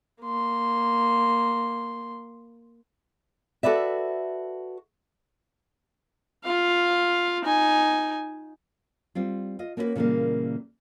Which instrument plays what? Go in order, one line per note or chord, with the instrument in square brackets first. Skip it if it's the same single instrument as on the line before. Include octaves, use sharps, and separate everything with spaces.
[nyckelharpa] A#3 C6
[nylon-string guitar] F#4 A4 B4 D5 E5
[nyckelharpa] F4 F5
D#4 G#5
[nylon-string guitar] G3 C4 F4
F4 D#5
A#3 B3 C#4 E4 F#4 B4
A#2 C#3 E3 F#3 G3 A#3